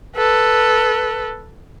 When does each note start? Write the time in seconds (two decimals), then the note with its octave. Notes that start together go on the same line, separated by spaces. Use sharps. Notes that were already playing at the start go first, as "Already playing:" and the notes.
0.16 A4 B4